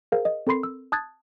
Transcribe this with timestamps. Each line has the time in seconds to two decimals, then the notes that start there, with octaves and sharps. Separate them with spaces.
0.12 G#4 A#4 C5 F5
0.25 D#5
0.47 C4 A4 A#4 B5 C6 C7
0.63 E6
0.92 A5 D#6 F#6 G#6 A6